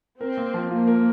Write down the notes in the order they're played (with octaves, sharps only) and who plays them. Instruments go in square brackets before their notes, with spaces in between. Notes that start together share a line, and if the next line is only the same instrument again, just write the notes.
[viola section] C4 [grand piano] A#4
[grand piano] A#3
F3
[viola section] A#3 [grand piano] F4
[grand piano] A#4